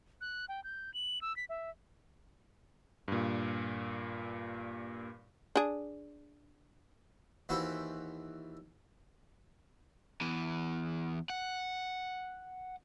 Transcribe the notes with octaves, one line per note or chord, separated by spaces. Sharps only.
F#6
G5
G6
F#7
E6
B6
E5
G2 A#2
D4 G#4
D#2 E3 E4 F#4 B4 C5
E2 E3
F#5